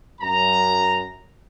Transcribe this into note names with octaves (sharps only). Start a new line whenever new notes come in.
F#2 A#5